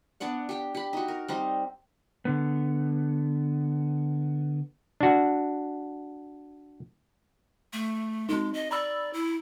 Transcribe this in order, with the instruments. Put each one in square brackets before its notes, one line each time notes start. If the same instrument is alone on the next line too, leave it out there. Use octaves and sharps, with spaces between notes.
[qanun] B3 D4 D5 F#5
G4 G5
G4 B5
D#4 F#4
A#4
G3 C4 D#4
[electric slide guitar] D3 B3
[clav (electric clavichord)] D4 F#4
[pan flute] A3
[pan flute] G#3 [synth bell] C4 D#4
[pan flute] D#5
[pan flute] D5 [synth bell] A#5 B5 E6
[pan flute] E4